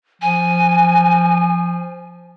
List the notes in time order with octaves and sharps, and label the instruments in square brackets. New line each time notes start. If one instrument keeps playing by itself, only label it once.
[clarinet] F3 [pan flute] G#5